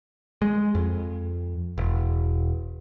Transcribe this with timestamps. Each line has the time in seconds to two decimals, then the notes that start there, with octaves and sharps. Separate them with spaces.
0.42 G#3
0.75 F2
1.78 E1